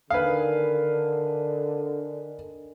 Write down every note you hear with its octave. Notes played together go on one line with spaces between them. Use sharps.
D3 D#3 G#4 B4 F5